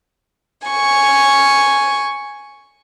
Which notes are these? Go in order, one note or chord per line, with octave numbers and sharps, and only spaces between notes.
G#5 C#6